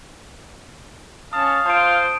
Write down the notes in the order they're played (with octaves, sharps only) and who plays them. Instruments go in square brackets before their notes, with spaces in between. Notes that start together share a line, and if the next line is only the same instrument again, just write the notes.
[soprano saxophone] C#4 [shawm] F5 [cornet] A5 [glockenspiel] D#6
[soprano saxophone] F4 [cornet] C5 [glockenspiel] A5 D7